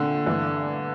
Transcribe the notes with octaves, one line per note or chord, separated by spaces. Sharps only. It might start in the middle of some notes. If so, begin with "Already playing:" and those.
Already playing: A#2 D3 A3 C4
G2 E3 A3 D4